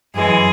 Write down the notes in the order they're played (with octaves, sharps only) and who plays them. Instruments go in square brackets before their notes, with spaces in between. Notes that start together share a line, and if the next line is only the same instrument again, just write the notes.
[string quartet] F#2 E3 G#3 G#4